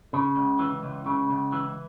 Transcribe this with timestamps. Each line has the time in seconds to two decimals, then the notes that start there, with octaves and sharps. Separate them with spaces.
0.13 C#3
0.36 C#2
0.59 E3
0.83 C#2
1.06 C#3
1.30 C#2
1.52 E3